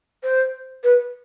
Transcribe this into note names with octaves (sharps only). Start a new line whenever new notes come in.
C5
B4